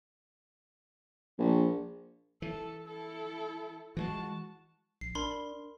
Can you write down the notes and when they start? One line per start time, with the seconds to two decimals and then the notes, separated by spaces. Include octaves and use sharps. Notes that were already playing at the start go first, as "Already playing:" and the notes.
1.39 A#1
2.42 E3 A4
2.86 E4 A4
3.97 E3 G3 G#3 F#4 A5
5.01 A#1 C7
5.15 D4 A#4 B5 C6